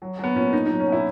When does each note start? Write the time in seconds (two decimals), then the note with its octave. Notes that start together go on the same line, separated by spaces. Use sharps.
0.02 F#3
0.19 F#3 B3
0.35 A#2 C#4
0.53 F#3 D#4
0.66 F#3 D#4
0.80 C#4
0.87 B2
0.92 E4